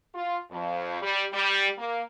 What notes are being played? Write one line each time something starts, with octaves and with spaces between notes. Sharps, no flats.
F4
F2
G3
G3
A#3